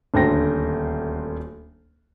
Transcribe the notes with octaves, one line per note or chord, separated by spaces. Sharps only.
D#1 D2 C5 G5 A#6